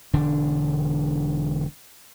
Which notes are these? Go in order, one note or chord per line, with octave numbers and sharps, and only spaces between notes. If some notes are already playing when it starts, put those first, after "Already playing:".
E1 D3 D4